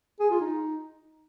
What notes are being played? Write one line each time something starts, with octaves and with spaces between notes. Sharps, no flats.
G#4
F4
D#4